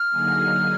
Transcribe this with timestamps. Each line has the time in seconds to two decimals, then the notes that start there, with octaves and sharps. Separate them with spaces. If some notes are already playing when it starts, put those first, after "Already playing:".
Already playing: F6
0.09 D3 F#3 A#3 D#4 G#4